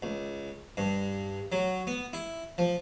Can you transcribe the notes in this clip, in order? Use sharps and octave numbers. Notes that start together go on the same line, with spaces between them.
C#2
G2
F#3
B3
E4
F3